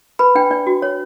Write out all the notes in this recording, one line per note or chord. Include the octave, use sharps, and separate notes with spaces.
B4 B5
D4 G5
D4 D5
F#4
C#5